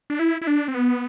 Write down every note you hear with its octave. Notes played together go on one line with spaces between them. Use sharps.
D4
E4
E4
D4
C4
B3